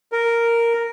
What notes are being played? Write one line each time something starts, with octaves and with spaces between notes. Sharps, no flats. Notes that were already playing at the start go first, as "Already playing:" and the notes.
A#4